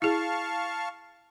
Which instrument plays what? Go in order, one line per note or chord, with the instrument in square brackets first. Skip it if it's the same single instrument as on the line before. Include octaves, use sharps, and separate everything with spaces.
[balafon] E4 G#4 [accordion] F5 A5 C#6